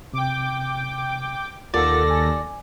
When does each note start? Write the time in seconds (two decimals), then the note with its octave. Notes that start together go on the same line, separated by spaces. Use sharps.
0.13 C3 G5 D6
1.74 D#2 F4 A4 A#4 D5 F#5 A#6
2.10 G#5